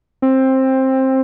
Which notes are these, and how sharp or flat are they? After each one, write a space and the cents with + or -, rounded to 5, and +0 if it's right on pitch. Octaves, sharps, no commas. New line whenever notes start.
C4 +15